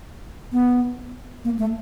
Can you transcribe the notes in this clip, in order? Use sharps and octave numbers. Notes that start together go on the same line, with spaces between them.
B3
A#3
A3